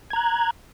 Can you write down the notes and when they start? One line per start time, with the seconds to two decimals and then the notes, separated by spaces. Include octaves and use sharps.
0.10 G#6
0.13 A#5
0.16 F#6